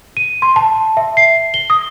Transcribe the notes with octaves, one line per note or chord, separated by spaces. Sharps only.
D#7
C6
A5
E5
C7
G7
D#6